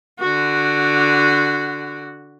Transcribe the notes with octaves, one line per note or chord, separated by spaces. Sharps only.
D3 F#4